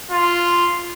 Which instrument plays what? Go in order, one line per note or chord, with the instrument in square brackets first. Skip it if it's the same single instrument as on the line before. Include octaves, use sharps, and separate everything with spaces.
[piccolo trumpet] F4